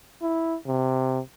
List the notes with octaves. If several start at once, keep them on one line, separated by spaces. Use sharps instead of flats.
E4
C3